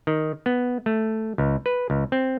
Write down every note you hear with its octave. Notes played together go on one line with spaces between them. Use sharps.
D#3
B3
A3
C#2
B4
C#2
C4